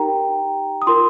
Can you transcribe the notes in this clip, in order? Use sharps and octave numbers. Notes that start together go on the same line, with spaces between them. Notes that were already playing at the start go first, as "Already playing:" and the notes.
Already playing: D#4 G4 A#4 G5 A#5
D#6
F4 A#4 C6